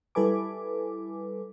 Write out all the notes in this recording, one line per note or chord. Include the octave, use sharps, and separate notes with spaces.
G3 E4 A4 B4 G#5 D6